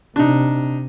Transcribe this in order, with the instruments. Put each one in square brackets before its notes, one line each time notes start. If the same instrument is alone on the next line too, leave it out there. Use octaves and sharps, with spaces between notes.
[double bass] C3 [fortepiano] D4 D#4